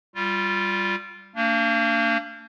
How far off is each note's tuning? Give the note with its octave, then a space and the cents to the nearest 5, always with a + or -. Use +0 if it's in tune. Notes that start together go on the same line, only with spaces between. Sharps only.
G3 +0 F4 +0
A#3 -35 D4 -15